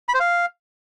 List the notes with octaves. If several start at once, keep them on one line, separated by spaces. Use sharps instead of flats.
B5
C5
F5